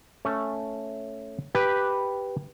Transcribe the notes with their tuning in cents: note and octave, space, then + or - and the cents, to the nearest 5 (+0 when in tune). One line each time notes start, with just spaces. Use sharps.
A3 +0 C#4 +0
G4 +0 B4 -5